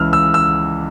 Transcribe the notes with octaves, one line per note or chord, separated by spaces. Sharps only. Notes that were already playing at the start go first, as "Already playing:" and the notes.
Already playing: C#2 C#3 E3 E6 F6
E6
E6